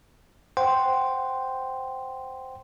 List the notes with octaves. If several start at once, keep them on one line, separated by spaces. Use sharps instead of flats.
C5 F#5 G5 C6